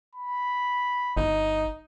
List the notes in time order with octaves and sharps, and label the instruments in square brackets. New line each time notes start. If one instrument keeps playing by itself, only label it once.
[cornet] B5
[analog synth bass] G1 [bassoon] D#4